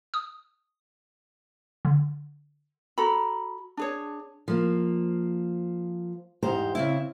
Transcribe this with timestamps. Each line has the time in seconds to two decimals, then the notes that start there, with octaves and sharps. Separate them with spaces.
0.14 D#6
1.85 D3
2.98 F#4 A4 A#5 B5
3.77 D4 G#4 C#5
4.48 F3 A#3
6.42 E2 G#2 G4 C5 A#5
6.75 C#3 C4 E4